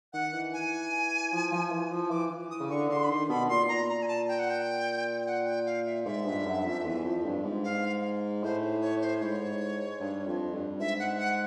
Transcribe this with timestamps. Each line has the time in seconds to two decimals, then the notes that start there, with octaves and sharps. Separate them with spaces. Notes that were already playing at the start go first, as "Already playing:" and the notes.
0.13 D#3 F#5
0.33 E3
0.53 G#5
1.32 F3
1.52 F3
1.71 E3
1.91 F3
2.10 E3 D6
2.31 E3
2.50 D#6
2.60 C#3
2.70 D3 C#6
2.89 D3 C6
3.04 B5
3.09 D#3 C6
3.29 B2 B5
3.49 A#2 C6
3.68 A#2 A#5
3.89 A#5
4.02 G#5
4.08 A5
4.28 G5
4.39 F#5
4.50 G5
5.26 F#5
5.46 G5
5.66 F5
5.86 E5
6.05 G#2 E5
6.25 G2
6.45 F#2
6.65 F2
6.84 E2
7.04 F2
7.24 G2
7.44 G#2
7.64 F5
8.43 A2 C5
8.81 C#5
9.01 C5
9.21 G#2 C#5
10.00 G2
10.26 F2
10.53 G2
10.79 G#2 E5
10.99 F#5
11.18 F#5